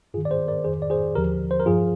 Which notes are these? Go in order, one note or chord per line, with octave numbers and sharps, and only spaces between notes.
G2 D#3 F4 G#4
D5
G#4 C5
A#4 D5
F2 D#3 G#4 C5
D5
G#4 C5
D#2 D3 F3 G4 A#4
C5
A#4
G2 F3 F4 G#4